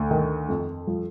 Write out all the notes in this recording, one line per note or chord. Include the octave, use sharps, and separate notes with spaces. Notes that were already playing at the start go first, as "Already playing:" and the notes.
Already playing: D2
D#3
F2
F3